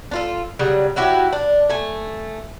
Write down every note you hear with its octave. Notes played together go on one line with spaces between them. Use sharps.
D4 F4 A4
C#3 F#3 G3
F#3 E4 F#4 G4
D4
A3 G#5